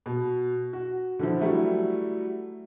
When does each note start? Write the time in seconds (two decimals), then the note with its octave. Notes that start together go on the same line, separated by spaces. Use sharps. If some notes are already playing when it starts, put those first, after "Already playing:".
0.06 B2
0.73 F#4
1.19 D3 E3 F3
1.40 F#3 G3 A3 E4 F#4